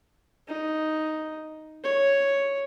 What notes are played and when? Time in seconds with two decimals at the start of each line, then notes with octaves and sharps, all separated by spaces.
0.47 D#4
1.83 C#5